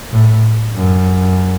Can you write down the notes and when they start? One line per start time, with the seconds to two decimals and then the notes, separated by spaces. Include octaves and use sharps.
0.12 A2
0.77 F#2